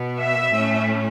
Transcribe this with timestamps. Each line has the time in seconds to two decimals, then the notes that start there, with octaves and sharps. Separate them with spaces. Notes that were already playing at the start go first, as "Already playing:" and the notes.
Already playing: B2 B3
0.18 E5
0.51 A2 A3 C#4